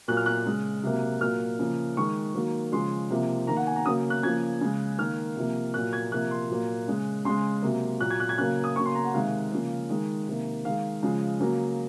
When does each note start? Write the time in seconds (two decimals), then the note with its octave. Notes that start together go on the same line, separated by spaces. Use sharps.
0.08 A#2 F#3 A#3 F#6
0.17 F6
0.26 F#6
0.46 C#3 G#3
0.83 C3 F#3 A#3
1.21 A#2 F#3 A#3 F6
1.59 C#3 F3 A#3
1.97 D#3 G#3 C#6
2.35 D#3 F#3 A#3
2.72 C#3 F3 G#3 C6
3.10 C3 F3 A#3
3.47 D#3 A#3 A#5
3.57 F#5
3.67 G#5
3.76 A#5
3.86 C#3 F#3 A#3 D#6
4.10 F#6
4.23 C#3 F3 A#3 G#6
4.61 C#3 G#3
4.98 D#3 A#3 F6
5.37 C3 F3 A#3
5.74 A#2 F#3 A#3 F#6
5.93 G#6
6.12 C3 F3 A#3 F#6
6.31 C6
6.50 A#2 F#3 A#3
6.88 C#3 G#3
7.25 C#3 G#3 C6
7.63 C3 F#3 A#3
8.00 A#2 F#3 A#3 F#6
8.10 G#6
8.20 F#6
8.29 G#6
8.38 C#3 F#3 A#3 F#6
8.64 D#6
8.76 C#3 F#3 A#3 C#6
8.86 C6
8.95 A#5
9.04 F#5
9.14 C3 D#3 G#3 F5
9.52 C#3 F3 A#3
9.90 D#3 G#3
10.28 C3 D#3 A#3
10.65 D#3 G#3 F5
11.03 C#3 F3 G#3
11.40 C#3 F#3 A#3